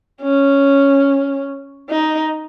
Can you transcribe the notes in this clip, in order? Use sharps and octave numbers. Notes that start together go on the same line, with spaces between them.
C#4
D#4